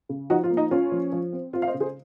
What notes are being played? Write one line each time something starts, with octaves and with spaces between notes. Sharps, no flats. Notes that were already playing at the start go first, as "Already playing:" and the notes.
C#3
F3 D#4 F#4
F4
A#3
D#4
C#4 F4
F3
F3
C4
C4 F4
F5
C5 D#5
C#3
G#4 C5